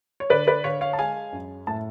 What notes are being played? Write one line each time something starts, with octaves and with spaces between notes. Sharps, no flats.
C#5
D3 B4 D5
B4 D5
D3 C#5 F5
C#5 F5
A5
G#3 F5 G#5
F#2
A2 A5